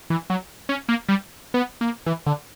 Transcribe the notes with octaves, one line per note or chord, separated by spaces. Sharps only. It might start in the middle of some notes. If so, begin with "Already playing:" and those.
E3
F#3
C#4
A#3
G3
B3
A#3
E3
D3